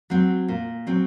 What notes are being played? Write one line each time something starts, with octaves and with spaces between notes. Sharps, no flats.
F#3 C4
A#2
F#3 C4